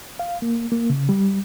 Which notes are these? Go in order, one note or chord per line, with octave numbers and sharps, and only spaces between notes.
F5
A#3
A#3
C#3
G3